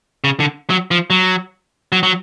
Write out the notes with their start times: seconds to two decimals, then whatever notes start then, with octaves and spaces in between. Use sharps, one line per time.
0.24 C#3
0.40 D3
0.70 F#3
0.91 F3
1.10 F#3
1.92 F#3
2.03 F#3